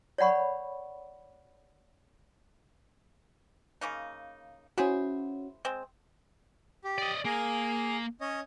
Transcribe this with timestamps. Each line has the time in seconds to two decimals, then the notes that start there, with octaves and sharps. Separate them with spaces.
0.18 C#5 D5 F#5 B5 C#6
3.81 C#3 A#3 D#4
4.78 C#4 E4 F#4 G#4 C5
5.65 G#3 C4
6.84 G4
6.98 D5 D#5
7.25 A#3 G#4
8.21 C#4 C#5 D#5